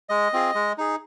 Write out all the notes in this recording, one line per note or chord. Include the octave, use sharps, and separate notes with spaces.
G#3 D#5
C4 F4 G#4
G#3
D#4 G#4